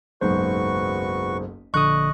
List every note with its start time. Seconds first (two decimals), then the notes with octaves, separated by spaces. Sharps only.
0.21 F#1 B1 G#2 F#4 B4 C5 C#6
1.74 A#1 D3 D#5 C#6 D#6 F#6